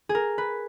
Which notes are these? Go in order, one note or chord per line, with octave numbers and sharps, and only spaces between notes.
G#4
A#4
B4